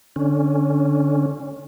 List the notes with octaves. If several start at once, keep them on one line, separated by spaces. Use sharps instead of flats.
D3 C#4